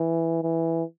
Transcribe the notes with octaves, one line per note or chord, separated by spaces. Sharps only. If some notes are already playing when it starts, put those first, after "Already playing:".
Already playing: E3
E3